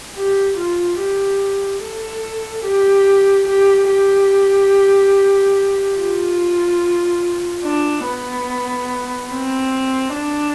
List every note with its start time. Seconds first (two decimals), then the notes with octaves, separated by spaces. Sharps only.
0.16 G4
0.58 F4
1.00 G4
1.83 A4
2.65 G4
3.48 G4
3.91 G4
5.98 F4
7.65 D4
8.06 B3
9.31 C4
10.14 D4